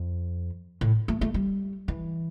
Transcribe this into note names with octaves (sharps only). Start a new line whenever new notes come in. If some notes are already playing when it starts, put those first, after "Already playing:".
Already playing: F2
A2
A3
A3
G3
E3